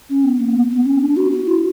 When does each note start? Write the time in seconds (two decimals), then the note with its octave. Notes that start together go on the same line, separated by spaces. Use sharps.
0.10 C#4
0.24 B3
0.40 A#3
0.55 B3
0.70 B3
0.85 C#4
1.01 D4
1.17 F#4
1.31 F#4
1.47 E4